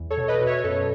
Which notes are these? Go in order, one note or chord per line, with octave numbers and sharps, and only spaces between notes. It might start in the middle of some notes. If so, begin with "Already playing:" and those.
Already playing: E2
A4 C#5
B2
B4 D#5
B2
C#5 E5
F#2 A4 C#5